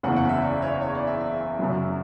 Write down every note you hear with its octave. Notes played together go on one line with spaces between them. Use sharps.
F#1 E2 C#3 F#5
F#5
E5
D5
C#5
C#5
D5
E5
E5
F#2 C#3 F#3